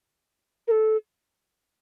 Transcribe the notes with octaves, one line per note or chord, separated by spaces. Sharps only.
A#4
A4